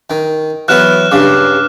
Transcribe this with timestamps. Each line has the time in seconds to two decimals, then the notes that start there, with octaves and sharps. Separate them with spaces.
0.10 D#3
0.68 E3 F#3 B3 F6 F#6 E7
1.12 G2 C#3 D6